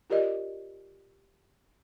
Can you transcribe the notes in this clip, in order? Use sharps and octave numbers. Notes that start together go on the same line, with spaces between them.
F4 G4 A#4 D5 D#5